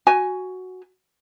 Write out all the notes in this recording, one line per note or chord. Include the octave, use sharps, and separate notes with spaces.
F#4 G#5